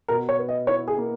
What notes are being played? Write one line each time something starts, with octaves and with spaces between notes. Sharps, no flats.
B2 A#4
C#5
B4
D#5
E4 C#5
G#4
A#3